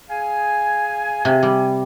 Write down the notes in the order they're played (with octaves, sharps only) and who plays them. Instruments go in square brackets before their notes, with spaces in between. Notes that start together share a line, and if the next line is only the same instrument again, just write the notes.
[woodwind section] G#4 F5 G#5
[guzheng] C3
G3